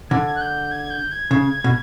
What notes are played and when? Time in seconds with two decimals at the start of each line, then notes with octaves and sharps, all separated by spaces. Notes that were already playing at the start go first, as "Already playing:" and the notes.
0.10 D3 G#6
0.35 F#6
0.41 G6
0.71 G#6
0.90 G6
1.12 G#6
1.31 C#3
1.64 B2